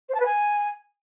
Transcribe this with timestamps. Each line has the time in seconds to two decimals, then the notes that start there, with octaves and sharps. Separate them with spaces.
0.09 C5
0.14 A5
0.20 B4
0.25 G#5